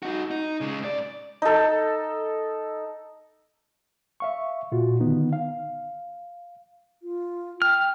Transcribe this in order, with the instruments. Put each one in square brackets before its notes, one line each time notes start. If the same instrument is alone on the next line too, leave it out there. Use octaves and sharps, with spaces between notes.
[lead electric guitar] D#4 F#4
D#4
C#3 G#3
G#2 D5
[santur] D#4 A4
[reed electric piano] E5 F5 C#6
A#2 F4 F#4
D3 D#3 B3 D#4
F5
[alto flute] F4
[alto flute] G5 [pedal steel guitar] F6